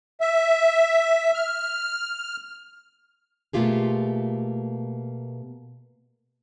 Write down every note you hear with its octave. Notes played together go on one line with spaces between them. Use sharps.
E5
F6
B2 A3 A#3 F4 G4 G#4